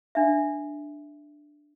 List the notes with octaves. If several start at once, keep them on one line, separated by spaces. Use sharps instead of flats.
D4 E5